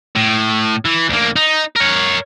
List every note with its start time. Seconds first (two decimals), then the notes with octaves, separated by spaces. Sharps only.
0.15 A2
0.85 E3
1.10 D2 A#3
1.36 D#4
1.76 A#4 C#5